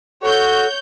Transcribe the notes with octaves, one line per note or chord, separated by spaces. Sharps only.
F#4 A4 C#5 G6